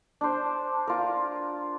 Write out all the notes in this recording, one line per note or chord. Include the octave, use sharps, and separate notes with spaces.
D4 C5
F4 A#4